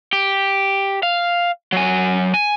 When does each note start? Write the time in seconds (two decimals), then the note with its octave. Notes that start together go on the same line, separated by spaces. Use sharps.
0.13 G4
1.03 F5
1.72 F#3 G#5
2.34 G#5